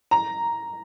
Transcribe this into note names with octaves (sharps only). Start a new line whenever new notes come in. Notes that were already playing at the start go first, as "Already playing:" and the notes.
A#5